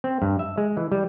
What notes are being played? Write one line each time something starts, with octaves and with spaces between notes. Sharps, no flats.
C4
G2
E5
G#3
E3
G3